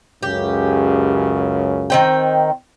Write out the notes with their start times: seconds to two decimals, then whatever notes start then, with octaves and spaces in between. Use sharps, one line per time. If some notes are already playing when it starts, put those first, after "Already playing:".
0.23 C#2 F#2 C#3 G4
1.90 D#3 C4 G5